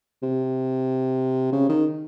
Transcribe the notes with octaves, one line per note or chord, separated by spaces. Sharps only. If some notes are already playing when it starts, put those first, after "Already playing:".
C3
C#3
D#3